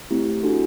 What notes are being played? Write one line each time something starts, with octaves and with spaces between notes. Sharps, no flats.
A3 C4 E4 G4
D4 F#4 A4